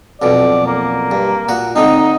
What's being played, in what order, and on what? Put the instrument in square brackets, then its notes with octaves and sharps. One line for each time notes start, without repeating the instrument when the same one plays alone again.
[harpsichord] B1 F2 B2 [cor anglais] D5
[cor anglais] A#3
[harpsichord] G2
A#2 F#4 D#6
[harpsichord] D3 A3 C4 [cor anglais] D#4